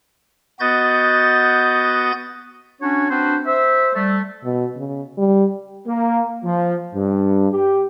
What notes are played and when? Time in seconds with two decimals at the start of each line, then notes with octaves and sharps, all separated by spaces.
0.60 B3 F#4 D#5 G6 A6
2.81 C#4 D4 F#4 C#5
3.10 C4 D4 F#4 B4 C5
3.46 C5 E5
3.94 G3 A3
4.44 B2
4.77 C#3
5.18 G3
5.86 A#3
6.44 F3
6.95 G2
7.52 G4